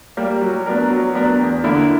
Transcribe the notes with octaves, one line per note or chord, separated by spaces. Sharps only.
G3 A#3
F#3
B3 D4 A#4
F#3
B3 D4 A#4
E2
D3 A#3 E4